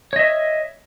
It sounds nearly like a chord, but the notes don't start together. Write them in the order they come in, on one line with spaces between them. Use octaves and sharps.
C#5 D#5 E5